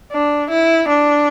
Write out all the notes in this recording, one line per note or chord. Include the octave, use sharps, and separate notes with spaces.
D4
E4
D4